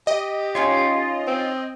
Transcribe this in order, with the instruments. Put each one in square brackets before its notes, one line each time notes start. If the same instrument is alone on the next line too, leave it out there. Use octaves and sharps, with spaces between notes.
[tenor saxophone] G4 [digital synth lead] D#5
[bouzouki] C#4 D#4 C#5 [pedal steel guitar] F4
[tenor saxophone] C4